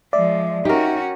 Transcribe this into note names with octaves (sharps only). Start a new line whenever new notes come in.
F3 G#3 D5 E5
C#4 D#4 F#4 G4 A#4